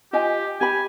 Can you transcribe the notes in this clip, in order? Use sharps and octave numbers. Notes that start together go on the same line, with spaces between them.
F4 G4 D#5 G#5
G4 G#5 B5